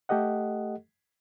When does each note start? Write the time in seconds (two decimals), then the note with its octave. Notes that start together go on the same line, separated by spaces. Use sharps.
0.09 A3 G4 A4 D#5 F#5